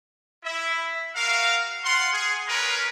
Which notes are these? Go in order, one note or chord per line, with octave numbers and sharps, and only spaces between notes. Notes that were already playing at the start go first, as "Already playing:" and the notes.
E4 E5
F#4 A#4 F5
F4 F#5 C6
G#4
C#4 A#4 B4 A#5